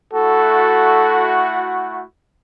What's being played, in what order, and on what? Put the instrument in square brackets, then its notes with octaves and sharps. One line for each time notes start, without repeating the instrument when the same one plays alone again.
[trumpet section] A3 E4 F#4 [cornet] A4